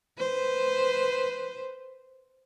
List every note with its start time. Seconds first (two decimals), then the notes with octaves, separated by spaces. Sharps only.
0.18 B4 C5